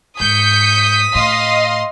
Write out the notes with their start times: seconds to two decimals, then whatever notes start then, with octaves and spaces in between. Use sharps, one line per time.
0.20 G#2 D#6 G6 B6 C#7
1.15 A2 D#5 F5 C6